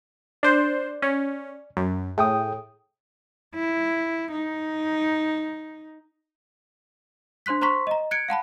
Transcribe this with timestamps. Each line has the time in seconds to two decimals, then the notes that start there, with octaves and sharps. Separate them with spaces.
0.43 D4 C5 D5
1.02 C#4
1.77 F#2
2.18 A2 G#4 G5 D#6
3.55 E4
4.31 D#4
7.46 D4 C5 C6 F#6 B6
7.61 C5 A#5 C6 C#6 B6
7.87 D#5 A#5
8.11 F#6 G#6 C#7 D7
8.28 F5 F#5 A5 B5